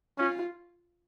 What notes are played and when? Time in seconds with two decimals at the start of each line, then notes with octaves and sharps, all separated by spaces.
0.18 C#4 F4